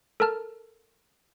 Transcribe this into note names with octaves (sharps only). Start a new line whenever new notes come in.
A4 A#4 A5 F6